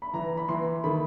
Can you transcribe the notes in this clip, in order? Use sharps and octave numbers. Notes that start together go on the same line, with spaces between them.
B5
E3 A#5
B5
E3 C6
D#3 B5